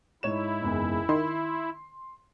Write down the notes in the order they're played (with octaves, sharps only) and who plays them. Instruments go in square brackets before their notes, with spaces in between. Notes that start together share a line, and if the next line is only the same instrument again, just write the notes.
[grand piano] G#2 C#5 E7 [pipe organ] E4
[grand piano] F#1 E2 G#2
[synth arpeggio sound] D#3 [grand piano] C6